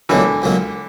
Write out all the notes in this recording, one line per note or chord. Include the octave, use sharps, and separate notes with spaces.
C#2 B2 D3 E3 F#3 A#3
C#2 B2 F#3 A#3